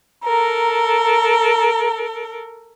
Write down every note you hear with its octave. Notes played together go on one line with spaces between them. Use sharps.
A4 A#4 A#5